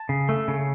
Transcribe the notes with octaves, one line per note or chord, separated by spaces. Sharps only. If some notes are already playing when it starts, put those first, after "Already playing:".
Already playing: A5
C#3
A3
C#3